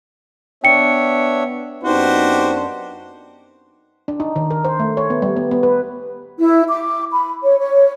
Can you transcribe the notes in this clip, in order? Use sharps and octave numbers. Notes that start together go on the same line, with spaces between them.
B3 D4 C#5 E5 G5 C#7
F#2 B3 C4 D4 D#4 F#4 G4 C5
D4
D#4
D#3
A#4
C5
A3
C#5
B3
G3
B3
B3
B4
E4
D6
B5
C#5
C#5